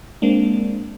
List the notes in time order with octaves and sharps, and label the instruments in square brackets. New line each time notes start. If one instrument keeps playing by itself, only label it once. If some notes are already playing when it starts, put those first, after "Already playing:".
[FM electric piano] G#3 A#3 C4 D4